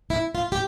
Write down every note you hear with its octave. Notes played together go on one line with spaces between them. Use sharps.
E4
F4
G4